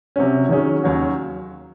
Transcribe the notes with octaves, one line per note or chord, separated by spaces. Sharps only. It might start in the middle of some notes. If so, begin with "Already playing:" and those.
C3 F#3 C#4
D#3 F#3 C#4 G#4
D#2 D#3 F#3 C#4 F#4